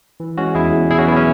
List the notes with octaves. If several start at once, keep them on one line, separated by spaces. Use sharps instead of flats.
E3
G#3 C#4 F#4
E2 E4 G#4
E2
B2 E4 G#4
C#4 F#4
F#3 B3 E4
C#4